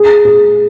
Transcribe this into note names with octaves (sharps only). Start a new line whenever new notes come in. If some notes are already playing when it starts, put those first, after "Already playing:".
Already playing: G#4
G#4